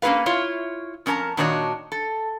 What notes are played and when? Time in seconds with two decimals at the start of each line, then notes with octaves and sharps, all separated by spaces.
0.02 A#3 C#4 F4 G#4 B4 F5
0.26 E4 F4 C#5
1.06 F2 C#4 D4 A#4 A5 A#5
1.37 A#2 D#3 D4 F#4 C#5 D#5
1.92 A4